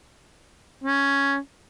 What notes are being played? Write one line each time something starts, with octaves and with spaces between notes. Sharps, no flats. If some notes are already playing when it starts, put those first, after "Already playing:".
C#4